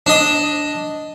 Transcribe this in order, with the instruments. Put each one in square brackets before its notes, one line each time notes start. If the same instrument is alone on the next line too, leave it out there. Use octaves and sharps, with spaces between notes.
[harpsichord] D4 D#5